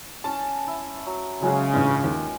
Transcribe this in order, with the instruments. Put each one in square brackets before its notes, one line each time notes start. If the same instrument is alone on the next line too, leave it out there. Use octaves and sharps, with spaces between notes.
[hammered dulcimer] C#4 [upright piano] A5
[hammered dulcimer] E4
F#3
[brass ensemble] C#3 [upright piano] F#3 F#4 G#4 [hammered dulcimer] G#3 C#4 F#5
[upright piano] A1 G2 [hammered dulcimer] F4
[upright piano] D#2